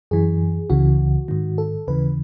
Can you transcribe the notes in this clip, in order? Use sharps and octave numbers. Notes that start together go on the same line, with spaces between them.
F#2 E3 G#4
C#2 C#3 E3 F#4
G#2 D#3
A4
D#2 C#3 E3 B4